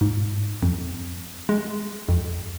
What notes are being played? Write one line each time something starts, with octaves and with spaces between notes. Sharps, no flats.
G#2
F2
G#3
F2